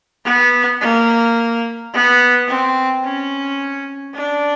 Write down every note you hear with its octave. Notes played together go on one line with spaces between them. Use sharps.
B3
A#3
B3
C4
C#4
D4